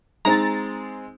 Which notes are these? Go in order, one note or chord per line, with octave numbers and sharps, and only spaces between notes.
G#3 C4 D#4 G#5 A#5 A6